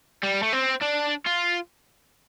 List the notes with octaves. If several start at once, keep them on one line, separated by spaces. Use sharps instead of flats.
G3
A3
C4
D4
F4